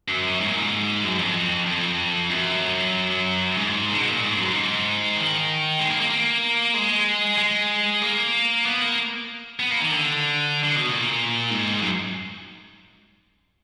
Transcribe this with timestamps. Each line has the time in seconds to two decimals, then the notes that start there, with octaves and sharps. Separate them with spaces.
0.08 F#2
0.40 G#2
0.48 A#2
0.56 G#2
1.04 F#2
1.19 F2
1.66 F2
2.29 F#2
3.57 G#2
3.88 A#2
3.94 D3
3.99 B2
4.10 A#2
4.20 G#2
4.36 F#2
4.52 G#2
5.16 D#3
5.79 G#3
5.90 A#3
6.00 A#3
6.10 A#3
6.74 G#3
7.38 G#3
8.02 A#3
8.65 B3
8.81 A#3
9.60 B3
9.71 A#3
9.81 D#3
9.91 D3
10.63 D3
10.76 B2
10.87 A#2
11.50 G#2
11.82 F#2